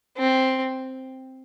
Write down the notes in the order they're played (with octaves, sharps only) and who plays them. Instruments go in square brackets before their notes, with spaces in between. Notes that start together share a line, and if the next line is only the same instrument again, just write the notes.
[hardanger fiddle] C4